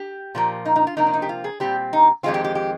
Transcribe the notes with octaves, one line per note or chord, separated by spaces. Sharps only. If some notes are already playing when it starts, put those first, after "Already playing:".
Already playing: G4
A#2 F3 A#3
D#4
D#4
F4
C3 F3 A#3 D#4
D4
D#4
G4
F4
G#4
A#2 G3 C4 G4
D#4
F2 D#3 G#3 C4 F4
G4
G4
G4